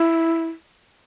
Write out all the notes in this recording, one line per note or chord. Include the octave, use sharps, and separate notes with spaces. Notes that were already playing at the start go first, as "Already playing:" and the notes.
Already playing: E4